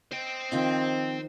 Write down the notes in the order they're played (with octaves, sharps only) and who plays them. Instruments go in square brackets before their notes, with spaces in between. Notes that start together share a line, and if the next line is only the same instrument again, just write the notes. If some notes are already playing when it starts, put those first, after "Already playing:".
[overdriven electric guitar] C5 G5 [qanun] D#5
[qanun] D#3 F3 D#4 [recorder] C4